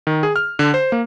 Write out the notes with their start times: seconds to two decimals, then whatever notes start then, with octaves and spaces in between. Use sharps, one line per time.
0.07 D#3
0.23 G#4
0.36 F6
0.59 D3
0.74 C5
0.92 A#3